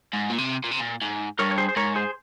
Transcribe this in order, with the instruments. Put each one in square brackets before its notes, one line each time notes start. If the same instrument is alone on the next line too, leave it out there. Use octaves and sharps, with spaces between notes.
[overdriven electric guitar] G#2
A#2
C3
A#2
C3
A#2
G#2
[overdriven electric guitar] G2 [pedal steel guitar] A#4 C#5
[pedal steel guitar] C#5
G#4 C5
C5
[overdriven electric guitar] G#2 [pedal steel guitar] A#4 C#5
[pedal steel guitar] G#4 C5